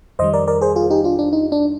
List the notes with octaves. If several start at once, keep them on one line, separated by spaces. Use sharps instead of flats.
F2 D#3 G3 C5 D#5
A#4 D5
A#4 D5
G#4 C5
F4 G#4
D#4 G4
D4 F4
D4
D#4
D4